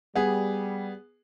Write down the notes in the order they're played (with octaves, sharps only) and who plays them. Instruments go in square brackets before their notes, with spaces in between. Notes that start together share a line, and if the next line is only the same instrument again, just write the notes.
[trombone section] G3 [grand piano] B3 G#4